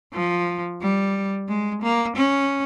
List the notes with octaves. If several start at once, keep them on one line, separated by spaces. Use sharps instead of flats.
F3
G3
G#3
A#3
C#4